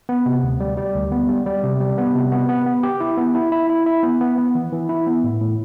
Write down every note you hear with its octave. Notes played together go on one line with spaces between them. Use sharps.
B3
C3
D2
G3
G3
D2
B3
G3
G3
C3
G3
B3
C3
B3
B3
B3
G4
E4
B3
E4
E4
E4
E4
B3
B3
B3
E3
E3
E4
B3
A2
A2